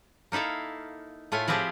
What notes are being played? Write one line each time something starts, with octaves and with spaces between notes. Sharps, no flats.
A#3 D#4 E4 A4 F5
A2 A3 F4 G#5
F3 C4 E4 F4 G4 G#4